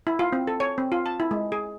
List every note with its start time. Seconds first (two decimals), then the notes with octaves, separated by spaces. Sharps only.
0.07 E4
0.19 F4
0.32 C4
0.47 A4
0.60 C#5
0.78 C4
0.92 F4
1.06 A5
1.20 E4
1.31 G#3
1.52 G#4